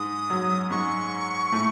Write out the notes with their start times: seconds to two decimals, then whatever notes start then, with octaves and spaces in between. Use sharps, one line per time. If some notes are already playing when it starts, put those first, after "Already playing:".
Already playing: G#2 G#3 D#6
0.30 F#2 F#3
0.71 G#2 G#3 C#6
1.52 A2 A3